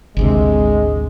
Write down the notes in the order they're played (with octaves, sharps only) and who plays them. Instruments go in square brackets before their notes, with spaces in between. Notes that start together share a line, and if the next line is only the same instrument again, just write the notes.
[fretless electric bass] G#1 D2 C3 [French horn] G#3